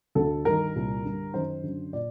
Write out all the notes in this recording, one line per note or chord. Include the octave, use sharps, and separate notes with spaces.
D2 D3 A4
G2 D#3 A#4
C2 A#2
G2 D3
F#2 D#3 C5
F#2 D3
A#2 D5